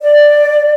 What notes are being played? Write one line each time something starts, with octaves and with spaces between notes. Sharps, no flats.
D5